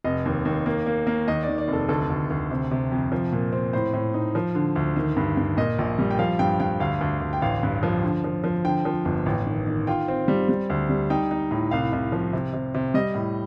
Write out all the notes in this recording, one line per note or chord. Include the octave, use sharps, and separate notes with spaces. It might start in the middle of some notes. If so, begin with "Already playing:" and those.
F1 D#5
D#2
D#2
A#3
A#3
A#3
D#2 D#5
D5
D#3
D5
F1
A4
D2 A4
D2
D2
C3
C3
F2
F3
A#2
C4
A2 C5
A2
D#4
F3
D3
D2
D#3
G2
G2
A#2 D#5
A#1
G3
G5
F3 F5
G2 G5
G2 G5
D2 F5
D2
D2
G5
A1 F5
G2
F3
D3
F3
F3
D3 G5
F3
G1
A1
D#3
D#3
F4 G5
C4
G3
G3
D2
G3
D#4 G5
D#4
A2
C2 F5
C2
F3
C3
C3
C3
G3 D#5
A2